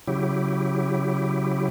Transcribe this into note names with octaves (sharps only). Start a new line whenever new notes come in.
C#3 F#3 E4 G4